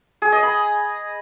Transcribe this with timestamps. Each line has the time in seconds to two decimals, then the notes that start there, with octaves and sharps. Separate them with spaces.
0.22 G#4
0.32 D#5
0.43 B5